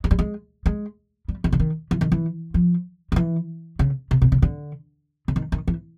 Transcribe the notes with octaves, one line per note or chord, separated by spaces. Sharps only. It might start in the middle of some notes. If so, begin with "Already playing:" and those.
G#3
G3
G#3
G#3
G3
D#3
D3
D#3
E3
D#3
E3
F3
D#3
E3
C#3
C3
B2
C#3
D3
D3
D#3
D#3
E3